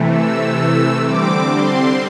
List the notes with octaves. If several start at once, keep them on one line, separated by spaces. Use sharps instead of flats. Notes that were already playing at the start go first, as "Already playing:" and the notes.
Already playing: C3 E3 A3
E6
D3 G3 C4 D6
C6